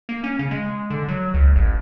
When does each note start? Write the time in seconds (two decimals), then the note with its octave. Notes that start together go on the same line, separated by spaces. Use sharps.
0.09 A#3
0.24 C#4
0.39 C#3
0.51 G#3
0.90 D3
1.08 F#3
1.34 C#2
1.56 A1